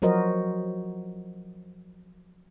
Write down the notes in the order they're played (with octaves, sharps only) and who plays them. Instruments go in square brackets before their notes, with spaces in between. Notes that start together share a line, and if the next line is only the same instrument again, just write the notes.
[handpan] F3 F#3 F#4 A#4 C5 D#5